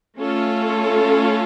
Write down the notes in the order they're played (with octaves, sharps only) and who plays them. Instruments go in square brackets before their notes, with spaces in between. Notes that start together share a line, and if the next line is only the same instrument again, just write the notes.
[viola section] A3 C#4 F4 A4